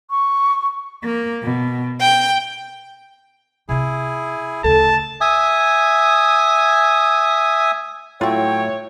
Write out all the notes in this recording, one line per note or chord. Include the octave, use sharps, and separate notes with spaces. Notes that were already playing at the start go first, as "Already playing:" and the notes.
C#6
A#3
B2
G5
C3 E4 F4 G#4
D2 C#3 A4 A5
E5 G#5 D#6
A2 F#3 E4 F4 C#5 G5